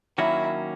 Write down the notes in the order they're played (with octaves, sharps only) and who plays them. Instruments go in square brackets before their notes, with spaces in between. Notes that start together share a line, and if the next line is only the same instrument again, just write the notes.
[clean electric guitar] D#3 F#3 A#3 C#4 F#4 [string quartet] E4